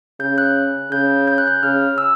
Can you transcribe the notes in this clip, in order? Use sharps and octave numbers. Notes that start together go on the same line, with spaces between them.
C#3 G6
F#6
C#3 G6
G6
F#6
G6
C#3 F6
E6